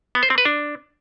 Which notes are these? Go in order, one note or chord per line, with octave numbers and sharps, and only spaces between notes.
B3
C5
C4
B4
D4